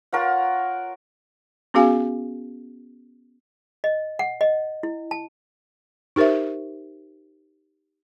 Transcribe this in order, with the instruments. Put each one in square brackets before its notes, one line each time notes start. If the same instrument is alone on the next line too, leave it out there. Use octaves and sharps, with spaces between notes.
[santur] F4 A#4 C#5 F#5
[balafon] B3 C#4 F#4 G#4 F5 G#5
[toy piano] D#5
F#5
D#5
E4
A5
[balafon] D#4 G4 A#4 C5 E5